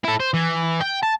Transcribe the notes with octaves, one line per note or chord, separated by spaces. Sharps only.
E4 A4
C5
E3
G5
A5